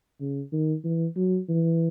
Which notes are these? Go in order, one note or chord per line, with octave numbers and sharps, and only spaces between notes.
C#3
D#3
E3
F#3
E3